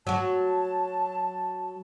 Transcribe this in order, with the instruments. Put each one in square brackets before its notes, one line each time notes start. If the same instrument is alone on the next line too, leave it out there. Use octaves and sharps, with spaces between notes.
[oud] F#3 F#4 [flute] A5